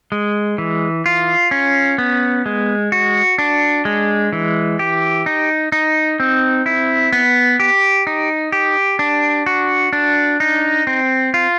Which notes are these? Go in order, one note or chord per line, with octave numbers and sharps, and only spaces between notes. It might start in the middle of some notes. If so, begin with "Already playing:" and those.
G#3
E3
F4
C#4
B3
G#3
F#4
D4
G#3
E3
G4
D#4
D#4
C4
E4
B3
G4
D#4
G4
D4
F#4
D4
D#4
C4
F4